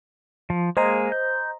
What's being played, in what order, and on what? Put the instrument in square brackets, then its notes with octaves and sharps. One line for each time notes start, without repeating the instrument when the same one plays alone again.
[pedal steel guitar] F3
[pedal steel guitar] G#3 A#3 G#4 [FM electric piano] C5 D#5 A#5
[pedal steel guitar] G6